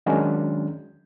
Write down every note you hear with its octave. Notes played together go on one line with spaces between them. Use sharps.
D#3 F#3 G#3 C#4 D4